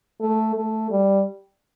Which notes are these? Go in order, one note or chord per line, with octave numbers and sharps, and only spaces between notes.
A3
A3
G3